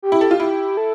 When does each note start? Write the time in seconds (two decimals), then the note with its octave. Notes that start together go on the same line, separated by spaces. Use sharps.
0.03 G4
0.12 E4
0.21 A4
0.31 F4
0.40 E4 G4
0.77 A4